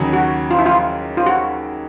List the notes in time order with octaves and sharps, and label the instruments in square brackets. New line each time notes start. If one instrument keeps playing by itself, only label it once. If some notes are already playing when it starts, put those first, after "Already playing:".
Already playing: [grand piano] D#2 C#3 F#3
[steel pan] F#4
F4
E4
F4
F4
F#4